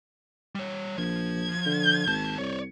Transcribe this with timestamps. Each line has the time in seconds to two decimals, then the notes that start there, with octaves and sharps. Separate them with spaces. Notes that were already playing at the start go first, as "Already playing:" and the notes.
0.55 G3 C#5
0.98 A#1 F3 G#6
1.66 D3
2.07 G#1 D#2 A5
2.38 C2 C#5 D5